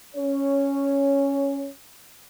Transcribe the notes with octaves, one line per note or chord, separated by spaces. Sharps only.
C#4 C#5